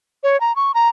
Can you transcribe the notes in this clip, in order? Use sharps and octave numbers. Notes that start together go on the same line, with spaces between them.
C#5
A#5
C#6
A#5